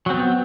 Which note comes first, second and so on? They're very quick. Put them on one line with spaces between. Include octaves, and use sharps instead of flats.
F#3 C4 B3